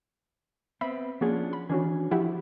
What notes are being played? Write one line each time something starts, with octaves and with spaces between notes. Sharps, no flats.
B3 C4 E5 B5
F3 A#3 C#4 D4 F#4 G#4
B5
D#3 E3 C#4 D4 F#4 G#5
F3 E4 F#4 G4